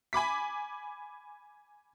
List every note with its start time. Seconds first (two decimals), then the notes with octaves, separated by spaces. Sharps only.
0.13 G#5 B5 D6 B6